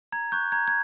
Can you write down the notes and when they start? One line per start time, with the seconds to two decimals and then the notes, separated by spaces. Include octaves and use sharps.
0.12 A#5 G#6
0.32 C#6 F#6 G6
0.52 A#5 G#6
0.68 G#6